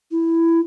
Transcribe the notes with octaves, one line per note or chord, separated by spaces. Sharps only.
E4